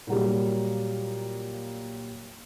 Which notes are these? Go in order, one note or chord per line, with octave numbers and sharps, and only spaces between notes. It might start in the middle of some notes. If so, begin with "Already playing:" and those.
A#2 F#3 G3